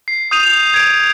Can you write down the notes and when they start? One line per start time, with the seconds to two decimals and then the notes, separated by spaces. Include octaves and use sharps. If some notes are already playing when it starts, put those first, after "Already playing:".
0.08 C7
0.31 D#6 G6 D#7 F7
0.74 G#6 D7